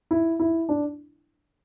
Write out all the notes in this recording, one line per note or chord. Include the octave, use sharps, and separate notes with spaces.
E4
E4
D4